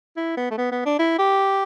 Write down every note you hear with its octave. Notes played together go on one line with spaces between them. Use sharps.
E4
B3
A3
B3
B3
D4
E4
G4